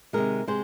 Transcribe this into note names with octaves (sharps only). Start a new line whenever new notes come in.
C3 D#3 G#3 A#4
C3 G#3 C5